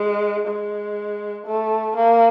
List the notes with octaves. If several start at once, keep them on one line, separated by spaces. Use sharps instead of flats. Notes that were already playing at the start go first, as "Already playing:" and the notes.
Already playing: G#3
G#3
A3
A#3